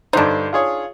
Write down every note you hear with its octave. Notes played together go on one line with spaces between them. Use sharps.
G2 D3 D4 D#4 C5
F4 G#4 C#5